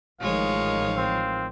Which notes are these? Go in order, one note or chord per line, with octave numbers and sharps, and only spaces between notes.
A1 D#3 F3 G#3 C#5 F5
C4